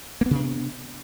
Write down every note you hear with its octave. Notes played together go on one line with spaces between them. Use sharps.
C3 A#3 B3 D4